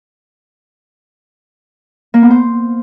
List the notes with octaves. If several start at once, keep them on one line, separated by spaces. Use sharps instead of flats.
A#3
B3
C5